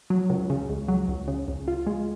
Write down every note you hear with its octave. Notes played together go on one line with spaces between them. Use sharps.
F#3
C#2
C#3
C#2
F#3
C#2
C#3
C#2
F4
G#3